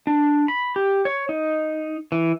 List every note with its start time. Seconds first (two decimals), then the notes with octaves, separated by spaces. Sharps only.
0.07 D4
0.48 B5
0.76 G4
1.05 C#5
1.29 D#4
2.12 E3